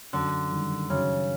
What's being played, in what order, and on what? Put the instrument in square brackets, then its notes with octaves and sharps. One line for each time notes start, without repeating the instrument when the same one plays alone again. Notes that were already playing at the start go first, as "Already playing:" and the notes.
[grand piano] F#2 [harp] D3
[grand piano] D#3 G3
[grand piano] F#2 [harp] C#3